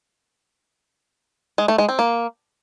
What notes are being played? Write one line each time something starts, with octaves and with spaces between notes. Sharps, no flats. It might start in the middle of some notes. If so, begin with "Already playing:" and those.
G#3
A3
G#3
C4
A#3